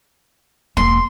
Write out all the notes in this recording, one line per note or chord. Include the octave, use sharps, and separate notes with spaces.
E1 A#3 C6